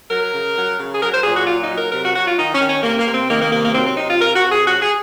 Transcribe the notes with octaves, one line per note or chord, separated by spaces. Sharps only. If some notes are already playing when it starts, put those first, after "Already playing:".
F#3 A#4
C#3
F#3
C#3
G#4
F#3 A#4
C5
A#2 G#4
F#4
F#3 F4
D#4
F#3
A#4
C3 A#4
F#4
F#3 F#4
F4
D#3 D#4
C#4
D#3
C#4
C3 A#3
A#3
C3
C4
D#3 A#3
A#3
C3 A#3
A#3
F#3 C4
C4
C3 D#4
F4
C3 A#4
F#4
C3
G#4
F#3 F#4
G#4